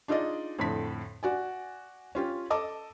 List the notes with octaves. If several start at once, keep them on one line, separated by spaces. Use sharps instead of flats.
D4 D#4 F4 G#4 D5 D#5
F2 A2 D3 B6
F#4 D5 G#5
C#4 F4 G4
A4 D#5 A5 D6